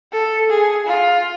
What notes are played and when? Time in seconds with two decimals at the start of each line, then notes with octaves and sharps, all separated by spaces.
0.12 A4
0.50 G#4
0.87 F4